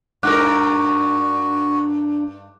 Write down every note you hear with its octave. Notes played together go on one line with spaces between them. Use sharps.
G2 D4 F#4 A#4 D6 F#6